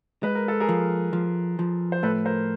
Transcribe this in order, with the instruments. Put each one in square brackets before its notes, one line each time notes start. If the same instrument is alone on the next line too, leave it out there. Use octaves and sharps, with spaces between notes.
[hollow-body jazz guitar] G#3 [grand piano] B4
[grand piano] A#4
A4
G#4 A#4
[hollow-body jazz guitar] F3
F3
F3
[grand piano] C5
[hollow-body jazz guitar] A2 [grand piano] A4 B4
[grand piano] A#4 C5